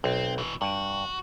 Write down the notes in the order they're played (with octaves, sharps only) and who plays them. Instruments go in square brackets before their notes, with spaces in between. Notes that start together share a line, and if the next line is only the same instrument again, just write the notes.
[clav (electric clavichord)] B1 [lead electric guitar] C4
[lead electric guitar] B2 E3
[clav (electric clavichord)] G2 [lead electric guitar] F#4